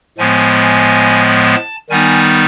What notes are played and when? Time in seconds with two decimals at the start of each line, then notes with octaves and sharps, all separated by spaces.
0.18 A2 F3 G#3 B3 G#5
0.61 G#5
1.46 A5
1.90 D#3 G3 B3 D#4 G#5